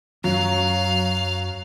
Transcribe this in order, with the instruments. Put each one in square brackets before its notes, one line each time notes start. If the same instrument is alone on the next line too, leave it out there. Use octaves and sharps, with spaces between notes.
[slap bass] F#2 C#4 [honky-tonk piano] F#3 [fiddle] F5